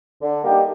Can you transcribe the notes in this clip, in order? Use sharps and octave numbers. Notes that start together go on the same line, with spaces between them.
D3
G3 A#3 D#4 G4